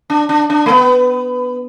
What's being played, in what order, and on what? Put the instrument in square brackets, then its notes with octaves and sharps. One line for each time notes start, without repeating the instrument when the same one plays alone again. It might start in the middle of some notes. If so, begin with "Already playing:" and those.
[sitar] D4
D4
D4
A3
B3